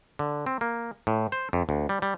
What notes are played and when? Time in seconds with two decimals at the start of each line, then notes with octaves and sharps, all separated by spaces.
0.19 D3
0.46 C4
0.61 A#3
1.07 A2
1.32 C5
1.53 F2
1.69 D2
1.89 G3
2.02 G3